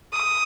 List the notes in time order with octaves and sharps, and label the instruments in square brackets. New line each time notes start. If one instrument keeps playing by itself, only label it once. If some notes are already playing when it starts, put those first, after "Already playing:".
[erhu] D#6